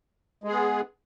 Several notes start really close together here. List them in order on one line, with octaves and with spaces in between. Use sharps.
G#3 G#4 B3